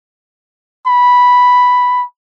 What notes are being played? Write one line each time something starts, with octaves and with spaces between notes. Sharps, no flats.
B5